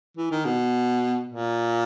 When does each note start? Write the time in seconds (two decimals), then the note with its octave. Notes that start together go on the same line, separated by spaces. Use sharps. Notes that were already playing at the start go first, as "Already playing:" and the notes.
0.17 E3
0.31 D#3
0.45 B2
1.29 A#2